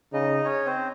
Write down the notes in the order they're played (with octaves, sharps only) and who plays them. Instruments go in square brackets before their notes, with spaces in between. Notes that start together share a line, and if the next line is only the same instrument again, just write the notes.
[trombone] C#3 [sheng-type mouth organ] D#4 D#5
[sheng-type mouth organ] C#4 C#5
C4 C5